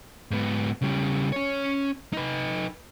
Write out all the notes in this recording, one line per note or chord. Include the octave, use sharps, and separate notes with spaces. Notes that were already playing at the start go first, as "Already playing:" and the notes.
G#2 B3
C#3 G3
C#4 C#5
D#4 B4